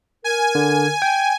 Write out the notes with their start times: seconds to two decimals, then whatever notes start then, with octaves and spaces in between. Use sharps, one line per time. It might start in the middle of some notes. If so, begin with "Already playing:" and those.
0.24 A#4 G#5
0.55 D3
1.02 G5